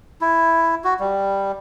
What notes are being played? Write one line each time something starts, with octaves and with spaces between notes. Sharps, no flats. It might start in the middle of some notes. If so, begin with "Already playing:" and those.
E4
F#4
G3